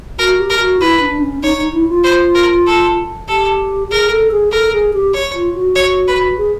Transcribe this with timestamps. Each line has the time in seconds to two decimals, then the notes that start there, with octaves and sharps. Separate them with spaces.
0.19 F#4 A#4
0.38 G4
0.50 A#4
0.59 F#4
0.80 E4 B4
1.00 D4
1.21 C#4
1.42 D#4 C#5
1.57 D#4
1.73 E4
1.89 F4
2.04 C5
2.35 A#4
2.67 A4
3.28 G4 A4
3.90 G#4 A#4
4.11 A4
4.31 G#4
4.52 A4 A#4
4.73 G#4
4.94 G4
5.14 C#5
5.34 F4
5.55 F#4
5.75 C#5
6.08 B4
6.38 G#4